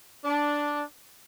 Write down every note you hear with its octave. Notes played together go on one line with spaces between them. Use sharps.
D4